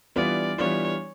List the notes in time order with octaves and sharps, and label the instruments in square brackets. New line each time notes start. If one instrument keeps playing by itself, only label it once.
[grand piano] E3 G3 B3 D4 F4 [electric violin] D5
[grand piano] E3 G3 B3 D4 F4 [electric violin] C#5